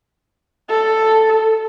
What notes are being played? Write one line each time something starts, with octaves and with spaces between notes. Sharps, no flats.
A4